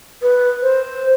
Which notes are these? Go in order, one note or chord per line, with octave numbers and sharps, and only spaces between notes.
B4
C5